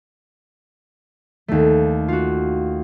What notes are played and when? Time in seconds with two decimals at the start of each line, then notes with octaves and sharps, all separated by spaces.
1.48 D#2 A3
2.08 F4 F#4